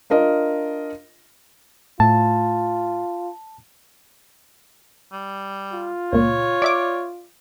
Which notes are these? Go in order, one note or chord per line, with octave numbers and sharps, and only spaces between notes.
D4 F4 A#4 D#5
A2 F4 A5
G3
F4
C#2 A#2 C#5
D5 E5 D6